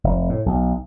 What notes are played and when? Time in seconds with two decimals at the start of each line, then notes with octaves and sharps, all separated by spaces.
0.04 F1
0.29 A2
0.46 B1